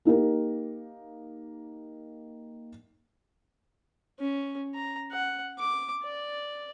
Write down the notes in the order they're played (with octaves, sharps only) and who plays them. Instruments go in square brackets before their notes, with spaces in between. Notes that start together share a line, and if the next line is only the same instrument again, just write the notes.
[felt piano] A#3 D#4 G4 A#4
[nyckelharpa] C#4
A#5
F#5
D6
D5